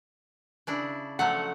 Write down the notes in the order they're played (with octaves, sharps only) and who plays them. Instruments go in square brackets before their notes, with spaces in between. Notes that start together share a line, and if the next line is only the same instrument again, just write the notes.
[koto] C#3 D4 E4
[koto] F3 F#3 A3 [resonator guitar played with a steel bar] F#5